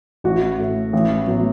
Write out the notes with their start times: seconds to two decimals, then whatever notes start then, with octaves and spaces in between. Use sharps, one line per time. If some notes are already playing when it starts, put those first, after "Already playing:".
0.24 A1 F#4
0.59 A2 A3
0.93 A1
1.27 A2 F#3 B3